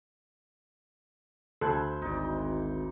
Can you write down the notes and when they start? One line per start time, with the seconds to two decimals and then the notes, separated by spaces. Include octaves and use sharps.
1.61 D2 A4 C5 B5 F#6 G#6
2.02 G#1 D#4 D5